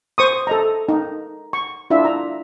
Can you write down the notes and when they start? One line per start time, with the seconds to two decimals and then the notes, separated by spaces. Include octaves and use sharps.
0.18 C5 C#6 D#6
0.47 A4 D#5 A#5
0.89 D#4
1.53 C#6
1.90 D4 E4 F4 E5
2.05 A#5